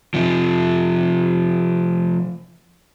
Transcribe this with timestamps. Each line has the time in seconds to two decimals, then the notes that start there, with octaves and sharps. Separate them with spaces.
0.14 C3 F3